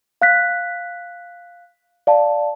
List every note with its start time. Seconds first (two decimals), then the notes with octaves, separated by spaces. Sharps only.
0.22 F5 F#6 B6
2.07 D5 F5 A5